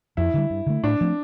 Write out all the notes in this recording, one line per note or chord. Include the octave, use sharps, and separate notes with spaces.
F2 E4
D3 G3
G2
D3 A3
A2 D4
F3 A3 C4